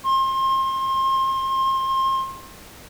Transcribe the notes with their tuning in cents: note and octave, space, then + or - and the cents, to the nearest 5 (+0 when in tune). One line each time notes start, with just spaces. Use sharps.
C6 +30